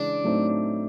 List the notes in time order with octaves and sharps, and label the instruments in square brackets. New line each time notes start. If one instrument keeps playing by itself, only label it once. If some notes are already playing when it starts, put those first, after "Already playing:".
Already playing: [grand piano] C#3 E3 G#3 [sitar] D4
[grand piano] A2 F#3 A3 C4 D#4